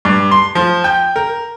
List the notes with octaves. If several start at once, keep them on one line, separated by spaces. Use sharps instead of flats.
G2
C6
F3
G5
A#4